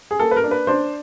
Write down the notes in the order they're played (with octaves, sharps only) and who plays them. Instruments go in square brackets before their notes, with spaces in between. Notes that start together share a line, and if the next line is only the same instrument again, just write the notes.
[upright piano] G#4
A#3 A4
B4
A#4
D4
B4
D4 C5